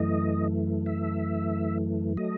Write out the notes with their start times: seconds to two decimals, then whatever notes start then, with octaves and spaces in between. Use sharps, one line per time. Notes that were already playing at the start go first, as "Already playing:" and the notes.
Already playing: F#2 E3 A3 D#5
0.86 E5
2.17 F#3 A3 D#5